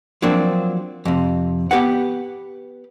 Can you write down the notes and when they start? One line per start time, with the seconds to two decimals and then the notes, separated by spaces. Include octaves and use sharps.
0.22 F3 F#3 A#3 C4 D4
1.05 F2 C3
1.71 B3 G4 B4 F#5